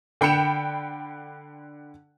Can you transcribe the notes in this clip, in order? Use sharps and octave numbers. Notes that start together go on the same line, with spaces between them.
D3 G5 B5 C#7 E7 F7